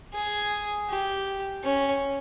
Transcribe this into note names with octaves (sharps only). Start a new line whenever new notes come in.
G#4
G4
C#4